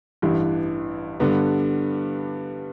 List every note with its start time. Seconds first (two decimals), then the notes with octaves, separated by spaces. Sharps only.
0.22 A1 G2 E3
1.20 G2 D3 G3 B3